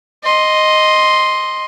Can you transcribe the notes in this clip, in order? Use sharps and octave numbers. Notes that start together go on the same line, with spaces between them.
D#5 C6